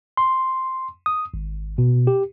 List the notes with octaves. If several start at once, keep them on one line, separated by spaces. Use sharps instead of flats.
C6
D#6
G#1
B2
G4